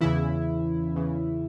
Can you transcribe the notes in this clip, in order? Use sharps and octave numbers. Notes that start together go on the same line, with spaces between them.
E2 C#3 E3 E4
E2 C#3 E3